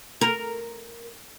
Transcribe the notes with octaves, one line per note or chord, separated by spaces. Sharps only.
A#4